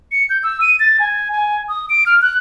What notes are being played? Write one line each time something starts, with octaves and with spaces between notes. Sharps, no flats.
C#7
G6
E6
D#7
A6
G#5
G#5
D#6
D7
F6
F#6